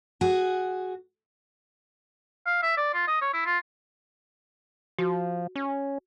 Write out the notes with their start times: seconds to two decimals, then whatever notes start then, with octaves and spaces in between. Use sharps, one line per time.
0.21 F#4 G#4
2.46 F5
2.63 E5
2.77 D5
2.93 F4
3.08 D#5
3.21 C#5
3.34 E4
3.46 F4
4.99 F3 F#4
5.56 C#4